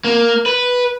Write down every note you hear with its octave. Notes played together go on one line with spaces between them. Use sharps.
A#3
B4